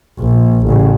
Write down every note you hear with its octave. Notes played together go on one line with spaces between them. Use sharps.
A#1
A1 C#3